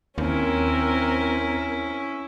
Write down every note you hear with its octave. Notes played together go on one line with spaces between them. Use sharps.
D#2 C4 C#4 E4 A#4